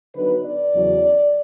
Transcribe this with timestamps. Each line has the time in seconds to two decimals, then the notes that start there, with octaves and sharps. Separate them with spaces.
0.15 D3 F#3 B3 D#4 B4
0.44 D5
0.73 E2 C#3 F#3